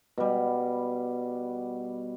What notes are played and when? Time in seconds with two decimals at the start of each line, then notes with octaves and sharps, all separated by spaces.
0.18 B2 G3